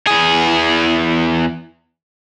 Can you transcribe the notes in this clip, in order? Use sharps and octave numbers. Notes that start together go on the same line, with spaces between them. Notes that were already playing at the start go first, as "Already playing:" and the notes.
E2 G#4